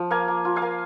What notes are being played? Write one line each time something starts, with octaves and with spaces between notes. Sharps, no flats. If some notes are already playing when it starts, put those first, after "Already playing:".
Already playing: F3
A#3 F5 G#5
A#3
F4
F5 G#5
A#3